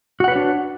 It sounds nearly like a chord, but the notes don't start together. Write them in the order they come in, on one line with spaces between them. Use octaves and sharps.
F#4 F#5 B4 C#5 D4